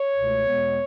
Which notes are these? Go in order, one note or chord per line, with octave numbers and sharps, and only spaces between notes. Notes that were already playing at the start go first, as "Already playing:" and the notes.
Already playing: C#5
C#2 B2 A3
E2 B2 G#3 B3